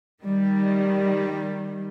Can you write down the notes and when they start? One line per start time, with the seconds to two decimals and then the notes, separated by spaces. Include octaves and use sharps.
0.22 D#3 G3